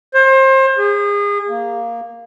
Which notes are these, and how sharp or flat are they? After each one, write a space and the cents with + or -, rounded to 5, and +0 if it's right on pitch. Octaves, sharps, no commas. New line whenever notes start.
C5 +30
G#4 -30
A#3 +0